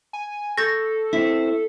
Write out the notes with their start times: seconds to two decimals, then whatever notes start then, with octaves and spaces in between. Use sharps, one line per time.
0.13 G#5
0.57 A4 C#6 G6 A6 A#6
1.13 C4 E4 B6